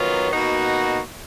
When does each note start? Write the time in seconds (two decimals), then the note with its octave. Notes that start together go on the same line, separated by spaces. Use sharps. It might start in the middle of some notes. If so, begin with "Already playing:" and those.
Already playing: D#3 F#3 B3 F4
0.31 B2 A#3 D#4 F#4